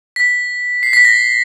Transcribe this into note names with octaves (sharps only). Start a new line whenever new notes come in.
B6
C7
B6
A#6